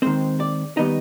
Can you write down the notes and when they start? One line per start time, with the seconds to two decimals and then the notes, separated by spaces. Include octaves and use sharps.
0.02 D#3 G#3 C4 C5
0.40 D5
0.77 D#3 G3 B3 D#4 D#5